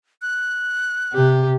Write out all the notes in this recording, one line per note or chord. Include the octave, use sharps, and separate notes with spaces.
F#6
C3 G4